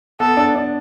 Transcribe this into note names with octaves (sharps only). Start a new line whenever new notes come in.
B3 A4
D4
D4